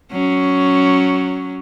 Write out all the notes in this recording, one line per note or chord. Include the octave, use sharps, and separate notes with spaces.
F#3 C#4